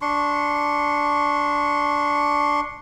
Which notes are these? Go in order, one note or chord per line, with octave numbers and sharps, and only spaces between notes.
D4 C6 C#6